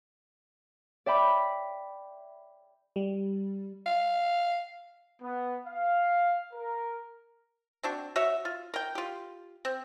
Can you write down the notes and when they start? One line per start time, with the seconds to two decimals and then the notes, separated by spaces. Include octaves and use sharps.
1.06 D5 E5 G5 B5 D6
2.96 G3
3.86 F5
5.22 B3
5.67 F5
6.53 A#4
7.83 C4 D4 F#4
8.16 F#4 C#5 E5
8.45 F4
8.74 A#4 G5
8.95 F4 G4
9.65 C4